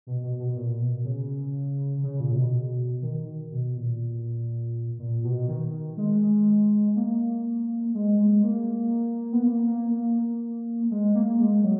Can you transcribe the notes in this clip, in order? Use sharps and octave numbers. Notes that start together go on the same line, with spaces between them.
B2
B2
B2
A#2
B2
C#3
C#3
A#2
C#3
B2
D#3
B2
A#2
A#2
B2
D#3
G#3
A#3
G#3
G#3
A#3
B3
A#3
A#3
A#3
G#3
A#3
G#3
F#3